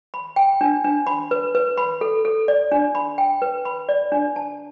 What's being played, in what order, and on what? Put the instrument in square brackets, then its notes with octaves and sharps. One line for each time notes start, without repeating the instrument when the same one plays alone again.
[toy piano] B5
G5
D4
D4
B5
B4
B4
B5
A4
A4
D5
D4
B5
G5
B4
B5
D5
D4
A5